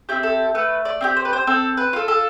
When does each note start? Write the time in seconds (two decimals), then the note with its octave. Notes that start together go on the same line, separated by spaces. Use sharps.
0.09 C4 E4 G4
0.23 A4
0.55 A3 B4
0.85 D5
1.01 C4 E4 G4
1.17 C5
1.25 B4
1.33 C5
1.47 C4 A4
1.77 B4
1.93 F4 A4
2.08 A4